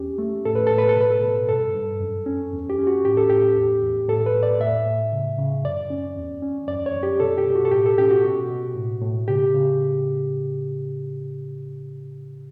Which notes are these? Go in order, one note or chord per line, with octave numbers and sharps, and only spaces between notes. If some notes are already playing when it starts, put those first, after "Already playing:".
Already playing: E2 C#4 G4
A3
A2 A4
B4
A2 A4
B4
A4
B2 B4
A4
B2
G2 A4
G2
F#2
C#4
E2
G4
C#4
F#4
A2 G4
A4
A2 G4
E2
E2
A2 A4
B4
A2
D5
A2 E5
A2
C#3
C#3
F#2 D5
C#4
E2
C#4
F#2 D5
C#5
F#2
G4
B2 A4
G4
B2
F#4
A4
A2 G4
A4
C#4 G4
F#4
B2
B2
A2
A2
C#3 G4
C#3